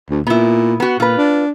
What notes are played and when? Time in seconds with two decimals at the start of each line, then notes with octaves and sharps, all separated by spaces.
0.10 D2
0.27 A#2 B3 E4
0.80 B3 F#4
1.00 A#2 F4 B4
1.17 D4